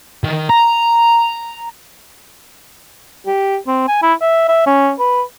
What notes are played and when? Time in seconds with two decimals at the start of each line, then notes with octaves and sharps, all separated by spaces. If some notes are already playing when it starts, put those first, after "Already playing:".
0.24 D#3
0.49 A#5
3.26 G4
3.67 C4
3.88 G#5
4.02 E4
4.21 E5
4.48 E5
4.66 C#4
4.99 B4